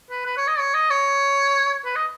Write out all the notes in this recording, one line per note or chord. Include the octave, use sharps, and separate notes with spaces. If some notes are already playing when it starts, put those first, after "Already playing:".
B4
B4
C#5
D#5
C#5
D#5
C#5
B4
D#5